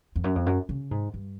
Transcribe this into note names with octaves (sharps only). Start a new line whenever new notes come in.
F2
F#2
F2
F#2
C#3
G#2
G2